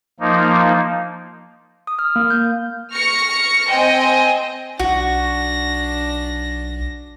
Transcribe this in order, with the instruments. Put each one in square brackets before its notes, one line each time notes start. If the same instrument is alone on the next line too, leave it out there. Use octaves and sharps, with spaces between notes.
[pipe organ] F3 A#3 D#4
[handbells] D#6
F6
A#3
G6
[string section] C#6 F6 A#6 C#7
C4 C5 D#5 G5 G#5
[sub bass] B1 [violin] D4 A#6 [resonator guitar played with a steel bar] F#4